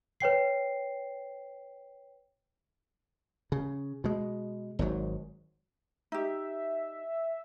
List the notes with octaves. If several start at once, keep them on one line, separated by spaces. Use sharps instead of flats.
B4 C#5 G5 C7
C#3
B2 G#3
G#1 G#2 F#3
D#4 G4 E5